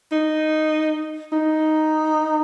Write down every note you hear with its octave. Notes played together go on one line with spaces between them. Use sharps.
D#4
D#4